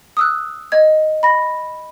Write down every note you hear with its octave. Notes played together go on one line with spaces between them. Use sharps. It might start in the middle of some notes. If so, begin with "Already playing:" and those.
D#6 E6 F#6
D#5 G#6
B5 A#6